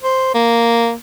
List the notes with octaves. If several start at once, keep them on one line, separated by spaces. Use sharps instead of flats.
C5
A#3